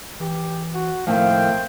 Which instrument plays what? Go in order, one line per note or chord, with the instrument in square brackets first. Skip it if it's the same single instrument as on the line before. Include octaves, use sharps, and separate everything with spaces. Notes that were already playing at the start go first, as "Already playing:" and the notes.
[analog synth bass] E3 [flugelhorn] G4
[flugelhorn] F#4
[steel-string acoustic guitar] A2 D#3 [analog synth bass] F3 [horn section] A#3 C4 G5 [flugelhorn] F5